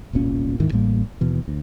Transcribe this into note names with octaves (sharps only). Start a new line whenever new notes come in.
E1 C2 A#2 C#4
D#1 G#2 D#3 E3
A1 A2 G3 A#3
D#2 B2 E3
D2